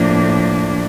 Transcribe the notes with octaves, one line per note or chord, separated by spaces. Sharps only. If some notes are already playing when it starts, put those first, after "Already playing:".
Already playing: A2 F3 A#3 D4